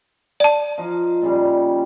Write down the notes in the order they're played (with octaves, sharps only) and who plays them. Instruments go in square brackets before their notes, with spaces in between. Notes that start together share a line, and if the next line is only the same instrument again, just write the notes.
[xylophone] D5 A5
[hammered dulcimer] F3 D#4
A#2 C#3 G3